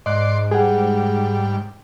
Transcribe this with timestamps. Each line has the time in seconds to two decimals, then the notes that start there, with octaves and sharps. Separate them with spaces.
0.06 G#2 D5 D#5 C6 F#6
0.51 G3 G#4 F#5